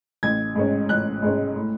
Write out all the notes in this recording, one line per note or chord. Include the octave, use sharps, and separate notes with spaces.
A1 G#6
G#2 G#3 C#4
A1 F#6
G#2 G#3 C#4
A2